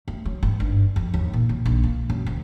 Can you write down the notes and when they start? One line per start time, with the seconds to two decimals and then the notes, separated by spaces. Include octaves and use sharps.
0.08 A3
0.25 F#3
0.43 G#1
0.60 G2
0.96 F2
1.14 D#2
1.33 A#2
1.49 D#2
1.66 A#1
1.83 A#3
2.10 F#2
2.26 D2